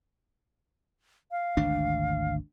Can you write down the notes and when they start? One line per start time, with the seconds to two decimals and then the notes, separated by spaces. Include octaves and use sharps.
1.31 F5
1.57 G#1 D2 D4